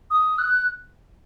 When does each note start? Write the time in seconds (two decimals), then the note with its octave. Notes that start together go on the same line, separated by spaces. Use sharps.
0.11 D#6
0.38 F#6